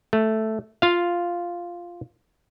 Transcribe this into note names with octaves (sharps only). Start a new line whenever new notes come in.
A3
F4 F5